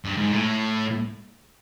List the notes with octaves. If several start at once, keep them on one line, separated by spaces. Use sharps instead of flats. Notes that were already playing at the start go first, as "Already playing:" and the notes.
G2
G#2
A2